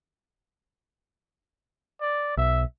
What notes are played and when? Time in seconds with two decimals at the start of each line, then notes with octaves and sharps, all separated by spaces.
2.01 D5
2.37 B1 E5